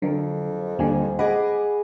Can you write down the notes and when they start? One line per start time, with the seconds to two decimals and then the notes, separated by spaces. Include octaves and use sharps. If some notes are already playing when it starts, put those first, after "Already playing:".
0.02 F2 D3 F#3 A#4
0.79 D#2 D3 G3 A#3 G#5
1.19 G#4 D#5 F#5 B5 D6